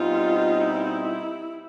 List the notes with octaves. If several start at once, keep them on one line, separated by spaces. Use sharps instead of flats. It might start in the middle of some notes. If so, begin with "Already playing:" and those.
Already playing: B2 G3 C4 D#4 F4
E4